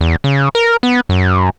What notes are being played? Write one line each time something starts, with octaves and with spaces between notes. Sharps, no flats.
E2
C#3
A#4
B3
F#2